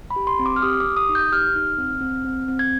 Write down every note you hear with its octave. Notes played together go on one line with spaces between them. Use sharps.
B5
G4
C6
C4
D6
F6
G4 D#6
D6
G4
D#6
D#4
G6
G4 F6
D#4
C4
C4
C4
C4
G#6